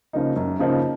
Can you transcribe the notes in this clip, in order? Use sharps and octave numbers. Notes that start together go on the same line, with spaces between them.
C#3 F3 A#3 D#4
F#2
C#3 F3 A#3 D#4